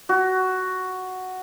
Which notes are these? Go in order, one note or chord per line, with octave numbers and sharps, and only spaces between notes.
F#4